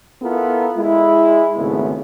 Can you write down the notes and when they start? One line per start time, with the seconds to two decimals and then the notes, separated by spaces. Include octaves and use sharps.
0.22 B3 E4 F4 A4 A#4
0.76 G#3 E4
1.57 G#1 C#3 A3 B3